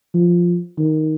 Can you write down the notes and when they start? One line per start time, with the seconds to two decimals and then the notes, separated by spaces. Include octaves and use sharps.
0.15 F3
0.78 D#3